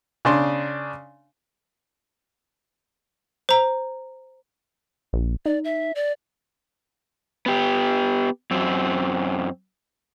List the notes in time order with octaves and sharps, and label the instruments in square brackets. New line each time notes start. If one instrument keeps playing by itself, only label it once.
[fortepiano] C#3 D4 C6
[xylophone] C5 A#5
[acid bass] A#1
[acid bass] D#4 [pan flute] D5
[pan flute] E5
D5
[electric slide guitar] B3 G4
F#2 C4